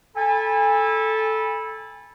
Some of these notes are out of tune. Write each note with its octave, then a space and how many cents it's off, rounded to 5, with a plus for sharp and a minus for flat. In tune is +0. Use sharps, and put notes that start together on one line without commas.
A4 -5 G#5 -30 B5 -15